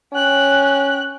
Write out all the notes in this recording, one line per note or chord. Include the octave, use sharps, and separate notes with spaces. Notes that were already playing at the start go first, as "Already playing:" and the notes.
C#4 G5 F#6